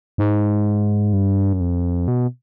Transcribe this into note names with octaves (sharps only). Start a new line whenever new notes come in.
G#2
G2
F#2
F2
B2